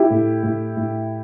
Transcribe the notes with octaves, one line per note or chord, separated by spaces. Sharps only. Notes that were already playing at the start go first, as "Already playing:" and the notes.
Already playing: E4 G4
A2
A2
A2